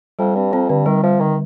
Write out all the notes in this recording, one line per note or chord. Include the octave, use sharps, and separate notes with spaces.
F2 G3
G2 C4
F2 C4
G2 D3
D#3 G3
F3 G3
D3 D#3